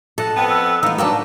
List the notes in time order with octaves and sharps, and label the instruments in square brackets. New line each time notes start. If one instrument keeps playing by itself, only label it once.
[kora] A4 D#5 F#5 [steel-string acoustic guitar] A5
[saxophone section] F2 B3 [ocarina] G5
[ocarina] E6
[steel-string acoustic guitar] E3 A3 [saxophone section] B3 [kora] D#4 [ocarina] F5
[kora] A#3 D4 [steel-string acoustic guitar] F#4 G5 A5 [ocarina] B4